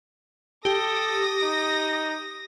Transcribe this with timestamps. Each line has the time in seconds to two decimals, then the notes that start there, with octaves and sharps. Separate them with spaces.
0.65 G4 A4 D#6 A#6
1.43 D#4